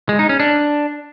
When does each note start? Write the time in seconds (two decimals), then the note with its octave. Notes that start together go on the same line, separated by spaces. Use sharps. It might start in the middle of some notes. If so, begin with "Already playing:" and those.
0.09 G#3
0.19 D#4
0.29 C#4
0.40 D4